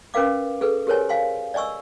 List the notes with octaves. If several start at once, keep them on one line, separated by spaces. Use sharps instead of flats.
C#4 A#4 B4 F5 D6
G#4 A4 B4
G4 G#4 A#4 C5 C#5 G#5
F5 G#5 C6
D5 D#5 G#5 C#6 E6